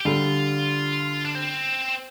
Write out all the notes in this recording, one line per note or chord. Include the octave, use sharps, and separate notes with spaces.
G4
D3 G3 F4
D4
C4